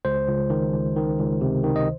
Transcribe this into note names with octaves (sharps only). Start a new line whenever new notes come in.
C#2 C5
C#2
D#3
C#2
D#3
C#2
C3
D#3
D#5